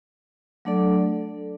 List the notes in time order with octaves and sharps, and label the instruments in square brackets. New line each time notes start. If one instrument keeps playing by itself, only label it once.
[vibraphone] F#3 A3 D4 A4 D5